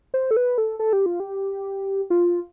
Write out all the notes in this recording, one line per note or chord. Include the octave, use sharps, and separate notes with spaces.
C5
A4
B4
A4
A4
G4
F4
G4
F4